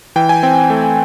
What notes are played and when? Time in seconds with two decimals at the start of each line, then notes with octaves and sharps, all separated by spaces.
0.16 E3 G5
0.29 G#5
0.43 C4 G5
0.70 A3